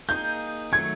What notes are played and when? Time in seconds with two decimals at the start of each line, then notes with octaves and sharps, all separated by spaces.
0.09 A#3 D#4 G#4 G6
0.72 D#3 F#3 A3 G#6